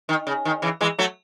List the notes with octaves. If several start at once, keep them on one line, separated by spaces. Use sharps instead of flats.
D#3
C#3
D#3
C#3 E3
E3 G#3
F#3 A3